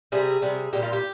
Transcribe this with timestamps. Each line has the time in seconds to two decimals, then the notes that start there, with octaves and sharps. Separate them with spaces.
0.12 C3 G3 G#4
0.42 C3 G3
0.73 A#2 G3 G4
0.83 F4
0.93 G4